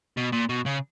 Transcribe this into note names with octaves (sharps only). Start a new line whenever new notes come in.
B2
A#2
B2
C#3